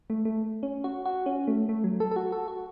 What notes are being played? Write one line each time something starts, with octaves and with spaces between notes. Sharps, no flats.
A3
A3
C#4
F#4
F#4
C#4
A3
A3
F#3
A4
A4
F#4
A4
F#4